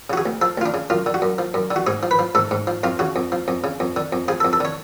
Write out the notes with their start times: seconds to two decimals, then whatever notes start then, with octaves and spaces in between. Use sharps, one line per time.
0.10 C#3 F#4
0.17 G#4
0.26 D2
0.41 F3 A4
0.58 D2 F4
0.66 D4
0.74 C#3
0.90 F#2 F4
1.06 D3
1.14 F#4
1.22 F#2
1.38 F3
1.54 F#2
1.71 D3
1.76 F#4
1.87 G#2 G#4
2.03 F3
2.11 B4
2.19 F3
2.35 G#2 A4
2.51 G#2
2.67 F3
2.83 F2 F4
2.99 C#3 F#4
3.16 F2
3.32 F3
3.48 F2
3.64 C#3
3.80 F2
3.96 D3
4.12 F2
4.28 F3 G#4
4.40 A4
4.45 F2
4.53 A4
4.60 D3 C#5